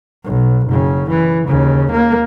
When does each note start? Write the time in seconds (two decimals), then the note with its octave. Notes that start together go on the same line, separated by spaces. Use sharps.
0.25 B1
0.67 F#1 C#3
1.10 E3
1.48 D#2 C#3
1.92 A#3